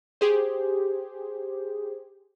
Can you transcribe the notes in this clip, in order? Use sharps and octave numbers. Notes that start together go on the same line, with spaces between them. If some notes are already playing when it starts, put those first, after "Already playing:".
G4 G#4 C5